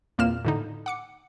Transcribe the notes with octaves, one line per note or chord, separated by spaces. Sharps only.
E2 A#2 A#3 C4 F6 E7
A2 D3 D#4
F#5 D6 C#7